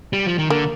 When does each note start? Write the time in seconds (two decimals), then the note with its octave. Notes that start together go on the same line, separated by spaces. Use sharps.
0.13 G3
0.26 F3
0.38 D#3
0.50 D3 A#3